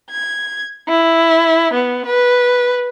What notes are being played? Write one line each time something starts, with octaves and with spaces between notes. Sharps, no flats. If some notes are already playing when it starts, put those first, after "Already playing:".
G#6
E4
B3
B4